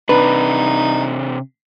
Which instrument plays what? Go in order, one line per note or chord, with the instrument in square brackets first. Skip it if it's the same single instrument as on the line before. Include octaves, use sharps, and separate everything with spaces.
[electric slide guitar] C3 D4 [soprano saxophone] D#4 [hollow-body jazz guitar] B4